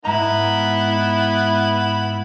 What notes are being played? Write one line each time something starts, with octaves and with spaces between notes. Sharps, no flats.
G#2 B3 E4 A#5 B5